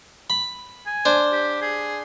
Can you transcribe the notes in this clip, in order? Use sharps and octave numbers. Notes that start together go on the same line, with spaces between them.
B5
G#5
D4 C5
G4
G#4